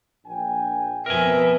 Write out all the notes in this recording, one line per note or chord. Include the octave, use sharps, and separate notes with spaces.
A#1 G5 G#5
F2 B2 B3 A#4 E5 G#5